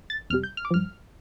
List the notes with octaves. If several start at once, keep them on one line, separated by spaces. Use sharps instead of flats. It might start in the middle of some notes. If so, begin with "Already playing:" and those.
A6
F2 C3 G3 F6
G6
F6
D6
G2 F3 F6